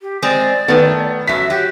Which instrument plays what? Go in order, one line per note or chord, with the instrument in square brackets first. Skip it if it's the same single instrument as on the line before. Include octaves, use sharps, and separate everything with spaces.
[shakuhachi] G4
[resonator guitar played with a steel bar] G#3 C4 G#4 [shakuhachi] D5
[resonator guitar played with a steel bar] D#3 A3 [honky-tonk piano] B3
[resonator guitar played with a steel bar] F#2 F#3 [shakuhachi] E5 [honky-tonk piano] B6
[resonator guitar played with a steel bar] F#3 [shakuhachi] G4